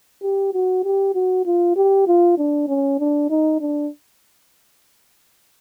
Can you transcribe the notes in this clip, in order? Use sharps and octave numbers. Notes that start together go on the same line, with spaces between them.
G4
F#4
G4
F#4
F4
G4
F4
D4
C#4
D4
D#4
D4